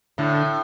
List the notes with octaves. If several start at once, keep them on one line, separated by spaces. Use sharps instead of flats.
A2 D3